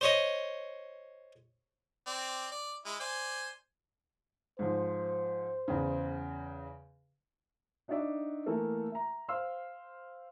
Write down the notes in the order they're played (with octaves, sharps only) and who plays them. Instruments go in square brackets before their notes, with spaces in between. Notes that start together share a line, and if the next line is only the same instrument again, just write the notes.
[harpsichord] C5 C#5 D#5
[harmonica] C4 D5
D5
G#3 E4
C5 D5 G#5
[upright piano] G#2 F3 [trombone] C5
[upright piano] E2 C#3
D4 D#4 F#4 D5 E5
E3 A3 A#3 A4 A#4
E5 A#5
C5 F5 C6 E6 F6